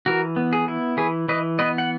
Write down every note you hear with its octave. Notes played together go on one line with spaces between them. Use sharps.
E3 F#4 A#4
B3
G#4
E4
E3 G#4 B4
E3 B4 D#5
B3 B4 D#5
F#5